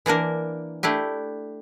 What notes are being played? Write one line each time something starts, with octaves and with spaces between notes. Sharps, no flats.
E3 A#3 D4 A#4
A3 D4 E4 G4